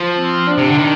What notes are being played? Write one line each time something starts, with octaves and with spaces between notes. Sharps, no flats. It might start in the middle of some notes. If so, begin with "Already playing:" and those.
Already playing: F3
C4
D4
C3
D3
D#3